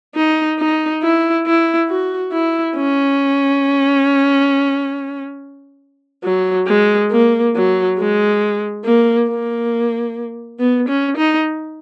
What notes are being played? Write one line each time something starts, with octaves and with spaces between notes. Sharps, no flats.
D#4
D#4
E4
E4
F#4
E4
C#4
F#3
G#3
A#3
F#3
G#3
A#3
A#3
B3
C#4
D#4